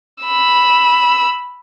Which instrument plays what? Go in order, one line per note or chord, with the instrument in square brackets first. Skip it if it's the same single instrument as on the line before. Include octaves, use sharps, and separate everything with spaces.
[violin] B5 E6